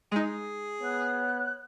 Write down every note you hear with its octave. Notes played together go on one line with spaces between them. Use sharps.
G#3 D#4 G#4
B3 C#5 F#6